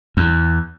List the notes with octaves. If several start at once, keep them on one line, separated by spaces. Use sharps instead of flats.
E2